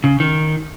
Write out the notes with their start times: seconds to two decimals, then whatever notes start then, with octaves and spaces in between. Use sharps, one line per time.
0.04 C#3
0.20 D#3